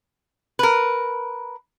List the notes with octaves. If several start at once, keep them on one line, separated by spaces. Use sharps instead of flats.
A#4 B4